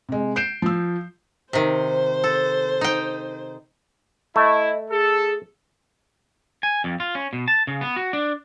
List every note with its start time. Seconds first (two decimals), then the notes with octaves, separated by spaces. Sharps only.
0.09 C3 G#3
0.36 G6 C7 D7 E7
0.62 F3 E6
1.53 C3 D#3 C5
2.24 A4
2.81 D#4 G5
4.36 A3 E4 D#5
4.91 G#4 A4
6.63 G#5
6.84 F2
7.00 F4
7.15 C#4
7.33 B2
7.48 A5
7.67 C#3
7.81 B3
7.96 F#4
8.13 D4